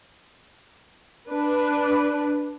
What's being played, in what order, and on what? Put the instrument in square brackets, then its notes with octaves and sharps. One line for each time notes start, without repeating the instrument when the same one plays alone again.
[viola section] D4 B4